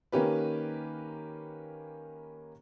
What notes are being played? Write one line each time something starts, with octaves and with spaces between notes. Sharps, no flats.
D#3 A#3 C#4 G4 B4